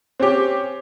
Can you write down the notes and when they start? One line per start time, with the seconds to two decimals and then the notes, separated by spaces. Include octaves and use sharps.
0.20 C4 C#4 G4